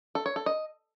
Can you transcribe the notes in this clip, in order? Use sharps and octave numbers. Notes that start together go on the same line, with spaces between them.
A4
C#5
A4
D#5